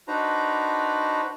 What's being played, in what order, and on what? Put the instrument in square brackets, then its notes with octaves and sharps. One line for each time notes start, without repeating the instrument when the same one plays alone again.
[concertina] D4 D#4 F#4 B4 C5 A#5